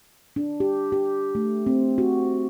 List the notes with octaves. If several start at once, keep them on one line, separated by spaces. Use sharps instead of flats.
D4
G4
G4
A3
C4
F#4